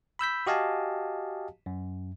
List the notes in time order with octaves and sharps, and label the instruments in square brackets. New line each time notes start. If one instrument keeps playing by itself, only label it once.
[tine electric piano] B5 E6 G6 B6
F#4 G4 D#5 F5 G#5 A5
F#2